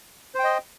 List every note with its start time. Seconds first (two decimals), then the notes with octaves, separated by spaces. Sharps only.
0.35 C5
0.39 G5
0.44 D#5